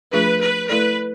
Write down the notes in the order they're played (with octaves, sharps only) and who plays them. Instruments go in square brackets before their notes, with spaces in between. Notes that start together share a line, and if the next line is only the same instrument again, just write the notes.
[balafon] F3 A3 D4 F4 G#4 [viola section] B4
[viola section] B4
[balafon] A3 E4 A4 D5 [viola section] B4